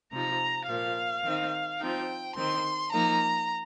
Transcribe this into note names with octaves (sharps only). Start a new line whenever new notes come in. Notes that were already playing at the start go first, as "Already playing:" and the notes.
C3 F3 D#4 A#5
A#2 F3 A#3 F5
D#3 C4 D#4
F3 C4 D#4 G5
D#3 C4 D#4 C6
F3 A#3 D#4 A#5